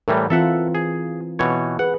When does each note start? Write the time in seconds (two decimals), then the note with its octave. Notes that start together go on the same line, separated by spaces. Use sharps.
0.08 A2 E3 G3 A#4
0.30 E3 C4 F4 A4 E5 F#5
0.75 G#4
1.39 B2 E3 C#5
1.79 G#4 B4 F#5